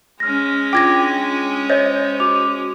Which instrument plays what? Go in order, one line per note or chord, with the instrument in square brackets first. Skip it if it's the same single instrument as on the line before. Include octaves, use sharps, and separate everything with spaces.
[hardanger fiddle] G#3 C#4 [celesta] F6 A#6
[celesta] D4 F4 D6 [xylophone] G5 G#6 A#6
[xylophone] C5 [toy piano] C#5 D#5 E5
[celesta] F#4 D6 F7